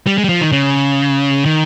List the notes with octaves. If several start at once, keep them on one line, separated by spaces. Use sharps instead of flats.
G3
G#3
G3
F3
D#3
C#3
D#3